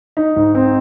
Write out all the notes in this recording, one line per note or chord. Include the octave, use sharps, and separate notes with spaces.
D#4
G#2
C4